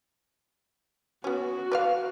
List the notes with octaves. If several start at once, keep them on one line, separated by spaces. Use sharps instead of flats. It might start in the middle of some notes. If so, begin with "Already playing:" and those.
B3 C#4 F#4
B4 D5 F5